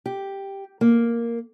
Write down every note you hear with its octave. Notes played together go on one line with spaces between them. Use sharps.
G4
A#3